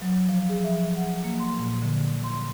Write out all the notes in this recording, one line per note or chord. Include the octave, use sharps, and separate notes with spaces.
F#3
F3
G#4
E5
F#5
A#3
C6
A#2
D3
C6